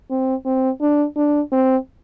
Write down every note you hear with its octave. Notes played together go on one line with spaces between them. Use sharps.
C4
C4
D4
D4
C4